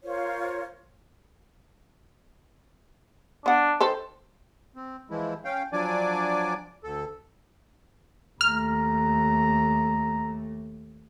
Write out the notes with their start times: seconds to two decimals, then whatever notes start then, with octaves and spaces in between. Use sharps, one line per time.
0.03 F4 A#4 C5 C#5
3.46 B3 D4 F#5
3.80 D#3 A4 B4 C5
4.76 C4
5.10 E3 F3 G#3 E4
5.44 C#4 F5 G5
5.73 F3 F#3 D4 D5 G#5 D6
6.84 D2 A4
8.41 D#2 A3 A#5 F6